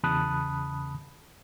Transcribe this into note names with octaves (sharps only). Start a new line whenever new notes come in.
E2 C#3 A5 B5 D#6 F#6